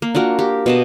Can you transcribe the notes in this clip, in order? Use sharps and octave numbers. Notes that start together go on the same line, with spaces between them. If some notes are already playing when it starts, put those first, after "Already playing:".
A#3
D4 F4 F#4 A#4
G4
B2 D#5 A5